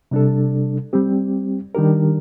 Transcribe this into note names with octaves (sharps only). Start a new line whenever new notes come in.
C3 G3 D4 A4
G3 C4 G4
D#3 G3 D4 G4 A#4